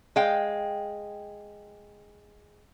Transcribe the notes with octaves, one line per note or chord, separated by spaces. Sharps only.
G#3 F5 G5